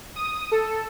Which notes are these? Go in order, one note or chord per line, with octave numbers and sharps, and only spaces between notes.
D#6
A4